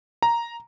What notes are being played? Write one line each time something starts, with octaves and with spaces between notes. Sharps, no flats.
A#5